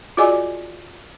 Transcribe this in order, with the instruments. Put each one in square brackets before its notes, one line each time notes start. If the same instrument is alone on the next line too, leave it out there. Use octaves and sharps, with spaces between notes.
[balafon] F4 F#4 G#4 D5 D#5 G#5